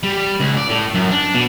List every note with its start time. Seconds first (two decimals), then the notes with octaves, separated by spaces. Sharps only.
0.03 G3
0.40 C#2
0.57 D5
0.69 A2
0.94 F#2
1.11 D4
1.35 B2